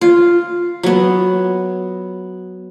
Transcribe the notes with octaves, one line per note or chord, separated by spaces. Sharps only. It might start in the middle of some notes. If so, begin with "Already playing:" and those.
F4
F#3 B3